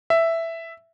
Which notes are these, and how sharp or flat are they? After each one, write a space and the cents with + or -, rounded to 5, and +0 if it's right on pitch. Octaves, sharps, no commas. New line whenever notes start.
E5 +5